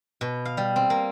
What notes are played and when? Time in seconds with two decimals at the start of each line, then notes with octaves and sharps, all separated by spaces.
0.21 B2
0.45 F5
0.57 G3
0.76 C4
0.90 A#3